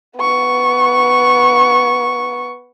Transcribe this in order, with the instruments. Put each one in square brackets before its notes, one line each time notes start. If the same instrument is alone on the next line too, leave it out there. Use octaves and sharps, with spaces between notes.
[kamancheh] B3 C#6